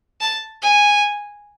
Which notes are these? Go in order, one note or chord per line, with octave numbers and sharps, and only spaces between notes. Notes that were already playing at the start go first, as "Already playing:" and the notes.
A5
G#5